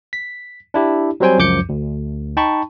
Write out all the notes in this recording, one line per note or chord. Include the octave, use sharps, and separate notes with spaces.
B6
D4 E4 G4
F#3 G3 C4 C5 G5 G#5
C#2 F#2 F3 D6 G6 C#7
D2
D#4 G5 A5 B5 C#6